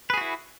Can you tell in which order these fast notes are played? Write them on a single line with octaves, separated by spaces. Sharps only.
B4 G#4 F#4 E4